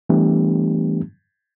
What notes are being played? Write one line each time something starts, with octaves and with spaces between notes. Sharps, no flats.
E3 G3 A3 B3 D4 G4